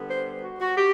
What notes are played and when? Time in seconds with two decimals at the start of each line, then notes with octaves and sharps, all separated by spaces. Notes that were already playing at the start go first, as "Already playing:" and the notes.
Already playing: D3 G3 B3
0.09 C5
0.42 F#4
0.60 F#4
0.76 G4